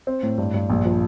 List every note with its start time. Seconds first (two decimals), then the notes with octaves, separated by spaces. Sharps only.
0.07 C4
0.23 A2
0.38 G2
0.54 G2
0.70 A#1
0.85 F3